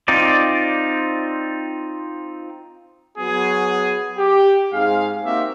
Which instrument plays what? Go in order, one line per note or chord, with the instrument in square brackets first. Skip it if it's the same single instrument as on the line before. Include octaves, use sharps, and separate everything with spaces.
[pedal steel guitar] C4 D#4 F4 D5
[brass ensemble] F#3 B3 F#4 G#4
G4
G#2 C4 G#4 F5
A#3 C4 D#4 F#4 G4 E5